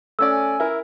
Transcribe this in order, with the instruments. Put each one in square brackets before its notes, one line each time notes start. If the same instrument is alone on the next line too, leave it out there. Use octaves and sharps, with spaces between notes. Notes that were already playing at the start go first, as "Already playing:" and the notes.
[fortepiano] A3 C#4 D5 [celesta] E6
[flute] G#5
[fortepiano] E4 A#4